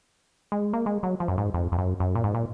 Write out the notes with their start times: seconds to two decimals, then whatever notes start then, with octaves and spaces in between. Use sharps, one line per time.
0.52 G#3
0.73 A#3
0.86 G#3
1.03 F#3
1.20 F3
1.28 F#2
1.38 G#2
1.54 F2
1.72 F2
1.78 F#2
2.00 F#2
2.15 A#2
2.24 G#2
2.34 A#2